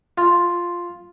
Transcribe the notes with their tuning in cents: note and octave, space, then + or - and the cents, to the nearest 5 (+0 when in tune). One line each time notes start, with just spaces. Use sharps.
F4 +0